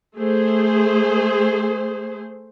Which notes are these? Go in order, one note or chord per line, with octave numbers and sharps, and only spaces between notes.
A3 G#4 C5